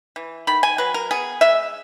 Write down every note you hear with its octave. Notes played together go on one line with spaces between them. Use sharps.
E3
D#3 B5
G#5
F#3 B4
A#4
B3 G#4
G#3 E5